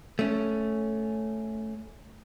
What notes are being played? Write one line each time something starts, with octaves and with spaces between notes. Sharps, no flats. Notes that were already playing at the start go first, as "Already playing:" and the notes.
A3 C#4